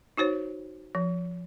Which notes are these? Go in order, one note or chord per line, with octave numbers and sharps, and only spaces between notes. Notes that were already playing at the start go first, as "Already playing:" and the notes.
D#4 F#4 C5 C#5
F3